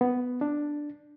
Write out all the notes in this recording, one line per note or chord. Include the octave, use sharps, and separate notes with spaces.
B3
D4